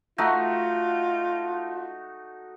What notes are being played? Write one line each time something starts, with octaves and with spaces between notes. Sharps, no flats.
A3 D#4 F4 F#4